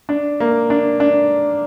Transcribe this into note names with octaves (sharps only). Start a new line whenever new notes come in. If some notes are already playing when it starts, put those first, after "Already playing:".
D4
A#3
D4
D4